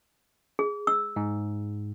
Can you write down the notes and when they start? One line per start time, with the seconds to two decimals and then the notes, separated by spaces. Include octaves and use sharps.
0.59 G#4
0.87 E6
1.16 G#2